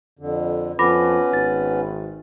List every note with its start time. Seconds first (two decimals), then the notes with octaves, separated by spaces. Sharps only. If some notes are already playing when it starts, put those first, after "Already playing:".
0.19 F2 D3
0.79 F2 B3 C#4 B4 B5 D6 A#6
1.33 G#1 A6